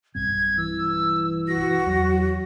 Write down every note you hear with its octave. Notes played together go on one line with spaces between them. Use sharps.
B1 G2 C4 G#6
E3 E6
F#4 A#6
E2 F#3